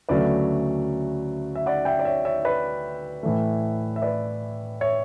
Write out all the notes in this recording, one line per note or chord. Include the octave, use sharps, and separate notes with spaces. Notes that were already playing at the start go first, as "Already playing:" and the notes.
D2 C#3 F#3 A3 B4 D5
E5
D5 F#5
E5 G5
D5
C#5 E5
C#5 E5
B4 D5
A2 E3 A3
E5
B4 D5
C#5 E5